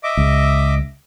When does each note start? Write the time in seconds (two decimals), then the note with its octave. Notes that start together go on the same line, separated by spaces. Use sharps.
0.04 D#5 E5 D6
0.17 C#2